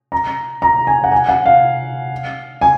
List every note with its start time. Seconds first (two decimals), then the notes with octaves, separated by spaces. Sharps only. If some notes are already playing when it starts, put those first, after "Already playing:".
0.12 A#5
0.62 A#5
0.87 G#5
1.04 F#5
1.12 G#5
1.29 F#5
1.46 F5
2.61 G#5